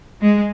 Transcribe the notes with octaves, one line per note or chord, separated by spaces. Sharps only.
G#3